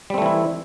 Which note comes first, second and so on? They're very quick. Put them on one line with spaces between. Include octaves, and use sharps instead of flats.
G3 C4 A3 E3 E4